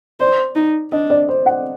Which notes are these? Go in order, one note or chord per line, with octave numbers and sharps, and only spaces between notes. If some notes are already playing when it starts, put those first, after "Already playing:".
C5 D5
D#4
D4 D#5
D5
C5
F#5